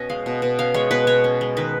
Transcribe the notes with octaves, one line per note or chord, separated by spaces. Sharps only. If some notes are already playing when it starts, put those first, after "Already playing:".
Already playing: B2 C#4 D#5
G#3 F5
B2
B2
C#4 F5
G#3 C#5
B2 B4
B2 C#5
C#4
G#3
D#3 B4